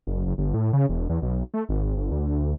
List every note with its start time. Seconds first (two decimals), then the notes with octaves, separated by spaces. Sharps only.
0.07 F#1
0.26 F#1
0.38 G1
0.54 A2
0.73 C#3
0.89 E1
1.09 E2
1.22 B1
1.54 A3
1.69 G#1
1.97 G1
2.11 D2